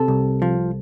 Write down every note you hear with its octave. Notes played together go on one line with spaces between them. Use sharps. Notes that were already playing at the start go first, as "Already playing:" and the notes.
Already playing: C3 A4
C2
F3